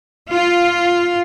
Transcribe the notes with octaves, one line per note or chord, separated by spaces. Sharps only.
F4